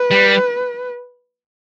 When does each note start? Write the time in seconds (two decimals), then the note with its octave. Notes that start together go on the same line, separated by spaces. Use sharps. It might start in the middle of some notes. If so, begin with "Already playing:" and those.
Already playing: B4
0.11 G3